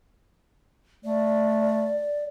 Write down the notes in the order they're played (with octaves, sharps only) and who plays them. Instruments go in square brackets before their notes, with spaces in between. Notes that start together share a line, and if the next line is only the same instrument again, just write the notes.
[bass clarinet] A3 [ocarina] D5